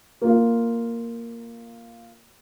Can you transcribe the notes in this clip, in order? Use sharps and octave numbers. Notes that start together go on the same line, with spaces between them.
A#3 F4